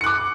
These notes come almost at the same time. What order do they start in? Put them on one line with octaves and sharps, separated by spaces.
C#7 F#6 D6